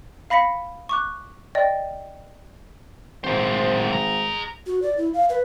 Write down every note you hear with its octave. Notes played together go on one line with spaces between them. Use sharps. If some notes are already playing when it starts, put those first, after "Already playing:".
F5 B5 A#6 B6 C#7
C#6 D6 F#6
D5 D#5 G5
G#1 F#3 C5
G#4 A#5
F#4
D5
E4
F5
B4